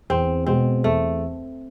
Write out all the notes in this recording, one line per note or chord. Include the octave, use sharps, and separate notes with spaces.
E2 C4
B2 G#3 C4
E2 A3